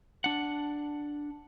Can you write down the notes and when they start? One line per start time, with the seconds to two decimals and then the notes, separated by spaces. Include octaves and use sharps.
0.24 D4 F#5